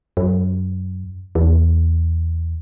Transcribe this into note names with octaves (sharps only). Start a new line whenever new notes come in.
F#2
E2